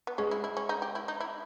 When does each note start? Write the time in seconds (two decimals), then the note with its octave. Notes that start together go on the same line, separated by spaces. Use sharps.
0.07 B3
0.18 G#3 C#4
0.31 E4
0.44 E4
0.57 C#4
0.69 D#4
0.82 G4
0.95 E4
1.08 D#4
1.20 E4